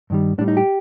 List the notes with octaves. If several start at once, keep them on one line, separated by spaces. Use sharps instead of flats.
G2 D#3 G3
A2 G3 D4
D#4
G4